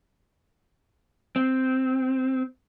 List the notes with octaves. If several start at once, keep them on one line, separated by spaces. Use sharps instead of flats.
C4